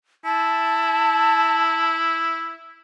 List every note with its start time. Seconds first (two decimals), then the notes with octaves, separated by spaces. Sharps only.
0.25 E4 A5